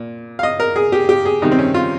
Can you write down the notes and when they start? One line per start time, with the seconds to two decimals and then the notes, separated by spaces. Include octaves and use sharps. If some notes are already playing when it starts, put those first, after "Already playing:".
Already playing: A#2
0.39 F5
0.43 D#5
0.60 A#4
0.76 G#4
0.92 G4
1.09 G4
1.25 G#4
1.42 C3 D#3 G3 D#4
1.51 C4
1.59 C#4
1.74 F4